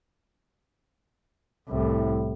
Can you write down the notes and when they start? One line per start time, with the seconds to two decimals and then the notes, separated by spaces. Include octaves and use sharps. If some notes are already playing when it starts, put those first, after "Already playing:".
1.68 C2 A2